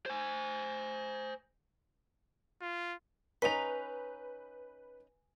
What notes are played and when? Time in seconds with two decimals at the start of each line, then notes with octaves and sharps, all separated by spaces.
0.06 C5 G#5
2.61 F4
3.42 C#4 D#4 B4 G#5 A#5 B6 F7